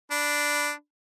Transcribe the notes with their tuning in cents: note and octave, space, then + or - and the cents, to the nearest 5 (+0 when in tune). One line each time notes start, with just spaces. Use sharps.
D4 +0 B5 -5